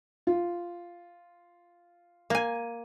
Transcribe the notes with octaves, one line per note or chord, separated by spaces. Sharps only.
F4
A#3 G#5